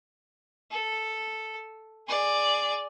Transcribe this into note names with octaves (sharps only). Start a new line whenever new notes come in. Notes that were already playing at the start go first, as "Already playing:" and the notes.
A4
G#4 D5